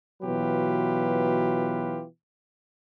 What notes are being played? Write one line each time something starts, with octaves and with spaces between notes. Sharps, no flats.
B2 E3 F#3 F4 G4 B4